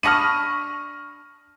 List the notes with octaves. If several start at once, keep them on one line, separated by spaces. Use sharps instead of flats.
D4 A5 B5 C#6 D#6 F6 A#6 D#7